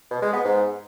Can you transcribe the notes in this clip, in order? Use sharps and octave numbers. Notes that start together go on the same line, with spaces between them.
B2
G#3
B3
G#2